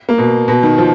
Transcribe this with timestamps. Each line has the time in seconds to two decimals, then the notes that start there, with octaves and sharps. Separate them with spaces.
0.09 A#3
0.18 B2
0.48 B2
0.63 D#3
0.78 F3